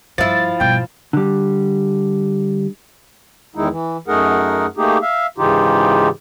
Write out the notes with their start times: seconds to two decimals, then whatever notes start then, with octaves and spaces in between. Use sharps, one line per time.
0.18 G2 F3 E4 A6
0.60 G2 B2 G5
1.13 D3 G3
3.55 E2 D#3 G#3 D#4 E4
3.70 E3
4.08 F#2 A3 D#4 G#4 A#4 F#5
4.77 A3 A#3 D#4 G4 G#4
5.02 E5 F5
5.38 G#2 C#3 E3 D#4 F4 G4